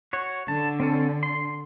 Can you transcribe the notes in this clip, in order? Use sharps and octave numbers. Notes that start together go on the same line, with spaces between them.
F#4 C#5
D3 A5
C4 C#4 A4
C6